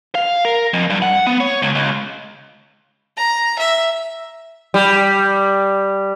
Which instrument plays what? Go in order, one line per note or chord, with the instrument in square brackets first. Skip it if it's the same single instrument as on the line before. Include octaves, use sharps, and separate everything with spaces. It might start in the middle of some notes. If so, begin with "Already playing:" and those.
[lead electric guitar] F5
A#4
F2
G2
F#5
B3
C#5
C#2
C#2
[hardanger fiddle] A#5
E5
[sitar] G3